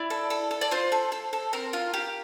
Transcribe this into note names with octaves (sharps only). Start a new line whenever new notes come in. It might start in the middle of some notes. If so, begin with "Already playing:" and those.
Already playing: E4 D5
A4
A4
A4
D5
F4 C5
A4
A4
A4
C4 A#4
F4
G4